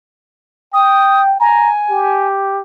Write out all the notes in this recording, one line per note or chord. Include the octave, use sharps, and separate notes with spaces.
G5 D#6
G#5 A#5
G4